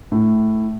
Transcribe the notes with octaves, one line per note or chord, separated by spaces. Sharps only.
A2